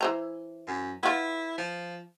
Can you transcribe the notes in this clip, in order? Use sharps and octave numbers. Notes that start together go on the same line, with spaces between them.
E3 C5 A#5
F#2
B3 E4 F4
F3